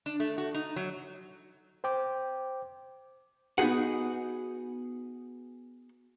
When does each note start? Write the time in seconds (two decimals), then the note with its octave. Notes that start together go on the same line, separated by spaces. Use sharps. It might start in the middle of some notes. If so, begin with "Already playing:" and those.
0.06 D4
0.20 A3
0.38 F#4
0.54 D#4
0.76 F#3
1.84 C5 G5 D6
3.58 B3 D#4 F#4 G#4 F#5